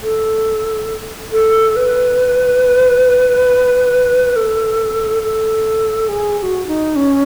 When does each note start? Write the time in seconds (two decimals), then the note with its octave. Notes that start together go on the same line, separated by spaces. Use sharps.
0.02 A4
1.32 A4
1.76 B4
4.36 A4
5.22 A4
6.08 G#4
6.38 G#4
6.43 F#4
6.67 D#4
6.96 C#4